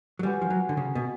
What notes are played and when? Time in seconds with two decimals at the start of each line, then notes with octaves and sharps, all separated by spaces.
0.19 F#3
0.23 G3 C#4 F#4 B4
0.41 F3
0.50 F#3
0.69 D3
0.77 C#3
0.95 B2